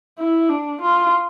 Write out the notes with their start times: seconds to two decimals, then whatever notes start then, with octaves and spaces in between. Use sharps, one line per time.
0.18 E4
0.49 D4
0.82 F4